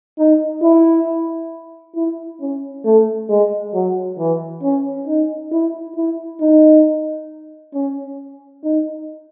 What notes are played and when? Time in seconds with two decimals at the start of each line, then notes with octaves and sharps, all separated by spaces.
0.18 D#4
0.63 E4
1.96 E4
2.41 C#4
2.85 A3
3.29 G#3
3.74 F#3
4.19 E3
4.63 C#4
5.07 D#4
5.52 E4
5.96 E4
6.41 D#4
7.74 C#4
8.64 D#4